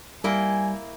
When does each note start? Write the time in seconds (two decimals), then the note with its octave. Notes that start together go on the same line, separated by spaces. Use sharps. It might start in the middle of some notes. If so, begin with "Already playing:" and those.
0.24 G3 A#3 E4 G5 G#5